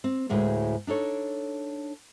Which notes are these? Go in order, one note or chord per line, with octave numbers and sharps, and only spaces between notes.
C4
D2 A2 G#3 A#3
D4 D#4 A4 C#5